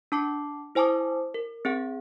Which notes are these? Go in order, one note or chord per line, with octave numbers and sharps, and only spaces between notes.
D4 A5 D6 C7
E4 C5 G#5 A5 D6 D#6
A#4
C4 G#4 F#5